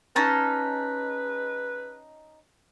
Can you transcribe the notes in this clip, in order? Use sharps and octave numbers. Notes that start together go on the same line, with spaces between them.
C#4 D#4 B4 A5